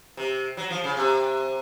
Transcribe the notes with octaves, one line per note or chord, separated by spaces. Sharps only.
C3
F#3
F3
C#3
C3